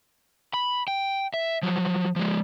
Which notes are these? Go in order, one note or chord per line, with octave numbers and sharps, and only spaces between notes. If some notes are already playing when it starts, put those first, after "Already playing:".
B5
G5
E5
F3 F#3
F3 G#3